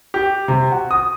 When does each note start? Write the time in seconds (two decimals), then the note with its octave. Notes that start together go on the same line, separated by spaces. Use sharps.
0.14 G4
0.48 C3
0.72 F#4
0.91 D#6